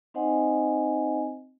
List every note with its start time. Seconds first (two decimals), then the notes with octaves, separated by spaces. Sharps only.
0.14 C4 D#4 C5 D#5 F#5 G#5